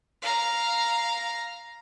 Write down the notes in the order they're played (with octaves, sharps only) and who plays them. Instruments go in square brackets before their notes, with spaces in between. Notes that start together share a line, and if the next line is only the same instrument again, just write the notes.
[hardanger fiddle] F5 A#5